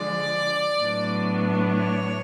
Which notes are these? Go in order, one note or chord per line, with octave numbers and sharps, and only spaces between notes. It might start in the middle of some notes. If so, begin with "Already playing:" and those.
Already playing: D3 F3 G#3 D5
A2 F#3 B3 D4
C#5